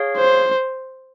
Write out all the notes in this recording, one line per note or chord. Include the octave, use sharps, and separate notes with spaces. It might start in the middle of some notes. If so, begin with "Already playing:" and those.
Already playing: G#4 C#5 F5
C5